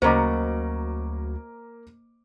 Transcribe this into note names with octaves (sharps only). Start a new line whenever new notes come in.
D2 C#3 F#3 A#3 C5 D#5 A#5 D6